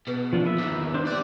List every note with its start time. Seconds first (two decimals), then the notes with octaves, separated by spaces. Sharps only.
0.07 B2 G#4 B4
0.33 F3 A#3 D4 F4
0.45 A#4 B4 E5
0.59 E2 D#3 E3 D6
0.94 E3 A#3 D4 B4 C5
1.07 G4 D5 F#6